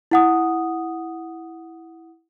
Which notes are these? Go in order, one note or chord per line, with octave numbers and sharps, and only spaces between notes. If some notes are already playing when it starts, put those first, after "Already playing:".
E4 F#5 D#6